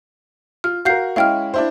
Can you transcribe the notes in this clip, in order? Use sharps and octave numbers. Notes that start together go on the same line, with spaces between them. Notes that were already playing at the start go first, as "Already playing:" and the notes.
F4 F6
F#4 A#4 F5 G6 C7
G#3 C#4 E4 F5 G5 F6
D4 E4 C5